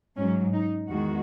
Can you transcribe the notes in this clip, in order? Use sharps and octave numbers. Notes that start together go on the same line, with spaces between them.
G#2 F#3 C#4
D#4
E2 D#3 G#3 F#4